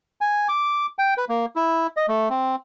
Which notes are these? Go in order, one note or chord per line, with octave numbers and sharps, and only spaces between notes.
G#5
D6
G5
B4
A#3
E4
D#5
A3
C4